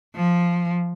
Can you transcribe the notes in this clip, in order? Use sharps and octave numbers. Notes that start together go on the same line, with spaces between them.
F3